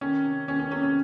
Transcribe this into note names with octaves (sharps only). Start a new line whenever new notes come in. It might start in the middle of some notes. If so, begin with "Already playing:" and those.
D#3 C#4
C3
D#3 C#4
C#4
C3 C#4
C#4